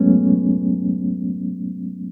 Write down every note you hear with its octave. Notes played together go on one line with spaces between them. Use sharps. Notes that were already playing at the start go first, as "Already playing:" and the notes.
Already playing: F#3 G#3 A3 B3 C#4